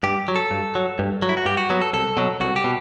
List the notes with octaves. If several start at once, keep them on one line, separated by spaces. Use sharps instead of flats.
G2 G4
F#3
A4
G2
F#3
G2
F#3
E4
F#4
G2 G4
F#4
F#3 B3
A4
C2 A4
B2 F#3
C2 F#4
G4
B2